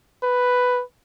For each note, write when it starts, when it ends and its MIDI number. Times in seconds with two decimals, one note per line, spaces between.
0.23 0.82 71